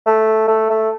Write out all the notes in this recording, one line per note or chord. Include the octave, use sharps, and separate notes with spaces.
A3
A3
A3